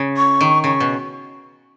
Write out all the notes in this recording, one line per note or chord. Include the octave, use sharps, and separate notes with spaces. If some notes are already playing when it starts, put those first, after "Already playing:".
Already playing: C#3
C#6
D#3
C#3 C#6
B2